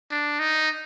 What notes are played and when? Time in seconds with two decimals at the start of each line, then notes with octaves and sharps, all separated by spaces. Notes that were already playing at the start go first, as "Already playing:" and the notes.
0.11 D4
0.39 D#4